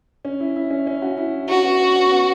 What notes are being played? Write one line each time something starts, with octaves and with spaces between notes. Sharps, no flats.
C#4
E4
E4
C#4
C#4
F#4
E4
C#4 F#4
B3
B3
C#4
B3